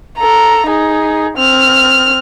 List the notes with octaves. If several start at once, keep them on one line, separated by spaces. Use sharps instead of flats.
A4 A#5
D#4 G#4
C4 F6